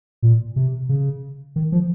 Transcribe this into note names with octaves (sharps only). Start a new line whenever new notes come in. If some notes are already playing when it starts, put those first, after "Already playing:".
A#2
C3
C#3
D#3
F3